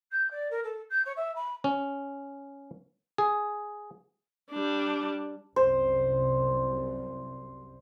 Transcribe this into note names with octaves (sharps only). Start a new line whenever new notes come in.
G6
D5
A#4
A4
G6
C#5
E5
B5
C#4
G#4
G3 D4
C2 F#2 C5